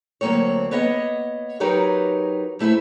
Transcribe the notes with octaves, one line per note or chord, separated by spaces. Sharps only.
D2 F#3 G#3 A#3 C4 C#5
A#3 B3 C#5 D#5 F#5
F#3 D#4 G4 A#4 B4 C#5
A#2 A3 E4 C5 E5